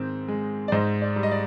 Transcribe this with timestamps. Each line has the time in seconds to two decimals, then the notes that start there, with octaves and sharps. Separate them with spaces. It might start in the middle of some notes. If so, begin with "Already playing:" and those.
Already playing: G#2 D#3 C4
0.28 G#3
0.68 D5
0.72 G#2 C5 D#5
1.02 D5
1.16 G3
1.23 D#5
1.31 D5